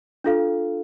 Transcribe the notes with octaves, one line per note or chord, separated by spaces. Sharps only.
D4 F4 A4 F5